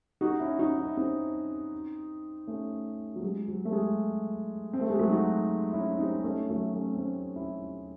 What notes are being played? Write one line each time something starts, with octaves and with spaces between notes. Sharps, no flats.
D#4 F#4
C#4 E4
D#4 F#4
C#4 E4
C4 D#4
A3 C#4
F#3
G#3
F#3
A3
G#3
C4
A3
G#3
F#3 A3
D#4 F#4
C#4 E4
C4 D#4
A3 C#4
F#3 A3
A3 C#4
C4
A3 C#4
C#4 E4